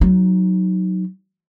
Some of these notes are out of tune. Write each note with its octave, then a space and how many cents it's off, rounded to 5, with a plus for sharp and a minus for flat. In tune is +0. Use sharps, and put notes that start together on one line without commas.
F#3 +0 D#4 +0